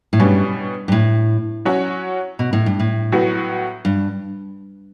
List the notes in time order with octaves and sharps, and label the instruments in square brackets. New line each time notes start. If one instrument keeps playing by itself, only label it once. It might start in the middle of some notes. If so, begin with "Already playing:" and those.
[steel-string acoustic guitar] A2
[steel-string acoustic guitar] G2 [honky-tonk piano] B2 G3 C#4
[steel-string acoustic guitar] G2
A2
[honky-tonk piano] F#3 C#4 F#4 C#5
[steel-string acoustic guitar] B2
A2
G2
A2
[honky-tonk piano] A2 F#3 B3 F#4
[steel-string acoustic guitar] G2